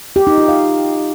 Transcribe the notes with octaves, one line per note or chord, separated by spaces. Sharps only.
G4
D#4
F4
F5